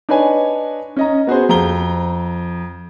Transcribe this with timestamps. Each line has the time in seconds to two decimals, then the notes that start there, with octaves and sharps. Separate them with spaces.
0.09 D4 D#4 B4 C#5 G#5
0.96 C#4 D#5 A#5
1.27 B3 F#4 G#4 C5
1.49 F2 A#5 G7